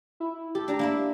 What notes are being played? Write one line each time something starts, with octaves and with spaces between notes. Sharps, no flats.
E4
G4 A4
D4 A#5
A#3 E4 E5